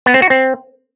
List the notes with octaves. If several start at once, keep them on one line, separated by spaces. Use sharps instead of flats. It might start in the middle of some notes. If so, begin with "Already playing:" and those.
B3
C4
F#4
C4